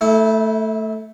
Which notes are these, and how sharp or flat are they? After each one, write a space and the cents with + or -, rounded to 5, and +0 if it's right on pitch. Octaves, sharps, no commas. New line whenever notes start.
A3 +5 E4 -30